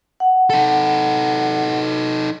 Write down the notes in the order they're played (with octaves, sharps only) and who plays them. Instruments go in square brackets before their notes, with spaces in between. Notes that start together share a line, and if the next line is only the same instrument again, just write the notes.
[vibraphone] F#5
[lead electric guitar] D#4 A4